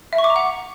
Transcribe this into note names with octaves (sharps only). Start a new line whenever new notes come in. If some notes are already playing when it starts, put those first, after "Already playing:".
E5
C#6
D6
A#5
F#5